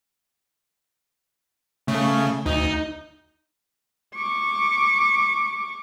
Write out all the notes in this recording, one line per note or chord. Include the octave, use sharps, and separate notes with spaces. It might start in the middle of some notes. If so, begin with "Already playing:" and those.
C#3 A3
D2 D#4
C#6 D6